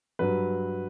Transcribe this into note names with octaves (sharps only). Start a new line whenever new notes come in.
G2 F#3 B4